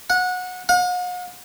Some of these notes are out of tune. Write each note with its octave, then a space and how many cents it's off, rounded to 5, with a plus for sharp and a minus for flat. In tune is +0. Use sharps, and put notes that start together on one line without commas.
F#5 -20
F#5 -45